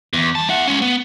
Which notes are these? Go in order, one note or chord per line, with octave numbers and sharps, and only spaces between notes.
E2
G3 A5
E4 F#5
G#3 C#4
B3